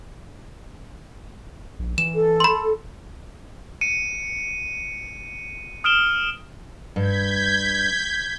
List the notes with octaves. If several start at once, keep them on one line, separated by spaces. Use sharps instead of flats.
A#1
E3 E7
A4
B5 C6
C#7 D#7
D#6 F6 D7 E7 G7
G2 G6 G#6 B6